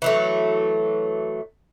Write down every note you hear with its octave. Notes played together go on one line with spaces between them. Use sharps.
E3 F#3 A3